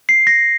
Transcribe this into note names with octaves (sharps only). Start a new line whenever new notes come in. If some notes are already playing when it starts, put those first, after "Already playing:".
C7
A#6